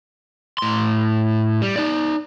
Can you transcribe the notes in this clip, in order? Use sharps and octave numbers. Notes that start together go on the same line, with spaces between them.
A2 C6
G3
D#4 D5